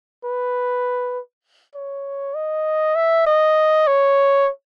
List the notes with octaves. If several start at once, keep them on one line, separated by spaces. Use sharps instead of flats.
B4
C#5
D#5
E5
D#5
C#5